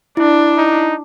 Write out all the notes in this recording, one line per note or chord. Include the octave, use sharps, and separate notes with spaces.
D4 E4
D#4